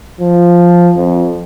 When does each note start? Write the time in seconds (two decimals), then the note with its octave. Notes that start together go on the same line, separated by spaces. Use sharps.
0.21 F3
0.96 F2